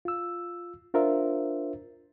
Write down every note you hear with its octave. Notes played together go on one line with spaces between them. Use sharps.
F4 E6
D4 F4 A#4 C5 E5